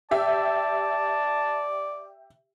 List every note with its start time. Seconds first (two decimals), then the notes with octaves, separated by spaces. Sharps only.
0.11 G4 D5 E5 A5